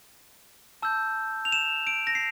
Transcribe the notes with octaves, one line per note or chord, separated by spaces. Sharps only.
A5 E6 G6
F7
E7
D7
A#6
C7